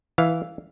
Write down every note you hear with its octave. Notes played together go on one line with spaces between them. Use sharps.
E3 F5